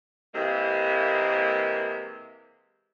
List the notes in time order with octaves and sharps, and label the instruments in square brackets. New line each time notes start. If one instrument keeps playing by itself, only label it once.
[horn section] C3 E3 G#3 A#3